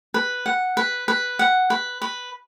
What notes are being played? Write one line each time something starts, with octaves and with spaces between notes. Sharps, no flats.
B4
F#5
B4
B4
F#5
B4
B4